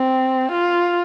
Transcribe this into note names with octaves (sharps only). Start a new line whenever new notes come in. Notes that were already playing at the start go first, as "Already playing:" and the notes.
Already playing: C4
F4